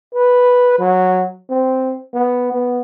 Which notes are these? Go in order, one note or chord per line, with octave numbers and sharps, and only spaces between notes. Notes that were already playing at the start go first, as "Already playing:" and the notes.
B4
F#3
C4
B3
B3